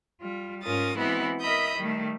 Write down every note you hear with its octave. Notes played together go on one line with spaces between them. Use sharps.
G3 F4
G#2 C#4 F4 A#4 D#6 A6
E3 G#3 B3 C4 E4 F#4
A#4 D#5 E5 B5 D#6 G6
D#3 G3 A3